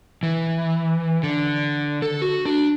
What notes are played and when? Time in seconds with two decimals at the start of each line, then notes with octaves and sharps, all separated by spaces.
0.23 E3
1.23 D3
2.02 A4
2.22 F#4
2.46 D4